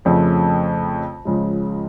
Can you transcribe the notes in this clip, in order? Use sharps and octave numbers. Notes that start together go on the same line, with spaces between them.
F2 C#3 F3 A3 C4
C#2 C#3 F3 G#3